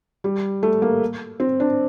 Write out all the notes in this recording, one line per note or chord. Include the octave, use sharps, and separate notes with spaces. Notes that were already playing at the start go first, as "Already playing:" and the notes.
G3
A3
A#3
C4
D4